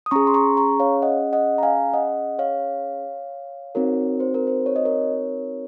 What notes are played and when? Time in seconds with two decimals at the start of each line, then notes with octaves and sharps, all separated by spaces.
0.06 D#6
0.11 C#4 G#4 A#5 C#6
0.27 C6
0.34 A#5 C#6
0.57 A#5 C#6
0.80 C#5 F5
1.02 D#5 F#5
1.33 D#5 F#5
1.58 A#5
1.63 F5 G#5
1.93 D#5 F#5
2.39 C#5 F5
3.75 C4 D#4 F#4 A#4 C#5
4.20 C5
4.34 A#4
4.47 C5
4.66 C#5
4.76 D#5
4.85 A#4 C#5